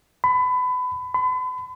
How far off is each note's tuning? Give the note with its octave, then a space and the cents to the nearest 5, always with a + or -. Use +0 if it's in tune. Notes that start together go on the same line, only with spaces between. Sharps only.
B5 +25
B5 +40